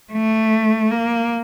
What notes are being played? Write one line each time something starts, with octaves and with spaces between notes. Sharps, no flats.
A3
A#3